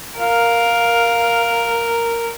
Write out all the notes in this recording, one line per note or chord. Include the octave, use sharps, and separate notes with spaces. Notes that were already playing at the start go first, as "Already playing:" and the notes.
A#4 F5